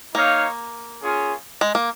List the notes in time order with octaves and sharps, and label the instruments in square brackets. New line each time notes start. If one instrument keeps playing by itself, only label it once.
[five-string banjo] A#3 [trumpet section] D#4 C#5 F5
[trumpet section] C#4 F4 G#4
[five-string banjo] G#3
A#3